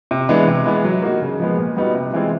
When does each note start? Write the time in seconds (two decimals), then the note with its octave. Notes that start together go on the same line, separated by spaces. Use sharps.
0.11 C3
0.29 E3 G#3 B3 D4
0.48 C3
0.66 E3 G#3 B3
0.85 F#3
1.02 A#3 D#4 F#4
1.22 C#3
1.40 F3 G#3 B3
1.58 A#2
1.77 G3 B3 D#4 F#4
1.95 C3
2.13 E3 G#3 C4 F4